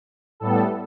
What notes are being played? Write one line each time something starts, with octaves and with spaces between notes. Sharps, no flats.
A2 G3 B3 A4